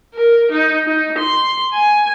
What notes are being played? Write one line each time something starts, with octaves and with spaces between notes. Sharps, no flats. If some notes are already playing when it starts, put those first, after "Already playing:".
A#4
D#4
D#4
C6
G#5